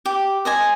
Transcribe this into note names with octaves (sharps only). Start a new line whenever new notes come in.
G4
C5 D#5 G#5